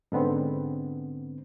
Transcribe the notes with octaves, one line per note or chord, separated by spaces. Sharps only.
G#2 D3 B3 C4